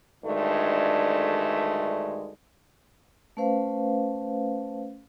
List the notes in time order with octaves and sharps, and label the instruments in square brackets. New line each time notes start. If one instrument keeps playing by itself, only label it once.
[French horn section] D2 G2 D#3 G#3 A3
[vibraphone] A3 C#4 B4 C5 F5